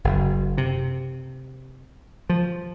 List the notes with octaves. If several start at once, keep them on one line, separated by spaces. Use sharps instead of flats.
F#1
C3
F3